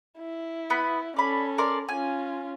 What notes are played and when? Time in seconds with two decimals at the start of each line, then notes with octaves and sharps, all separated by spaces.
0.18 E4
0.70 B3 B5
1.16 C#4 A4 D5 B5
1.58 A#4 D5 C6
1.89 C#4 F4 G#5